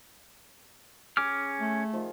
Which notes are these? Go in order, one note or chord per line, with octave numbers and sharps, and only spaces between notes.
C#4 G#4 G#5 D6 F6
A3
D#3 F3